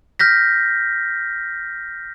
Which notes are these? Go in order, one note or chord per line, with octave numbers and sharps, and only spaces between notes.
F6 G6 A#6 B6